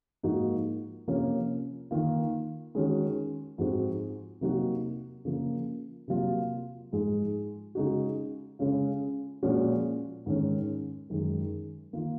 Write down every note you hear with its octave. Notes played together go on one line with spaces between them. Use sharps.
G#2 F3 A#3 D#4 F#4
C3 F3 A#3 C#4
D#3 A#3 F4
D#3 G#3 C#4 F#4
G#2 F3 G#3 C4 F#4
C3 F#3 A#3 D#4 F#4
C#3 F3 A#3
C3 F#3 A#3 F4
G#2 F3 G#3
C#3 G#3 D#4 F#4
C#3 G#3 C#4 F4
A#2 F3 G#3 C#4 F#4
G#2 D#3 G#3 C#4
F#2 D#3 G#3
D#3 A#3 F4